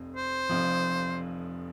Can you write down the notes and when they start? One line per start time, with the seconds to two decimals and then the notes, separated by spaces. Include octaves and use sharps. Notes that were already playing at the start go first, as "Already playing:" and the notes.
Already playing: F1 F2 C4
0.17 C5
0.49 F1 F2 F3